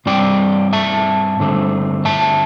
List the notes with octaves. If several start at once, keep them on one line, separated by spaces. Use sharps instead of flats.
G2 G3 C4 D5 G5
E5 A5
G2 D3 A3 C4
E5 A5